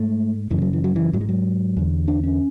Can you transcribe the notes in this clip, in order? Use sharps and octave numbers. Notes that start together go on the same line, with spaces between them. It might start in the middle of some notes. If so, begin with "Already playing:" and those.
Already playing: G#2 A3
F#2 C#3 E3
F#3
E3
F#3
E3
G#2 F#3
G#3
F#3
E2 D3
D4
C#4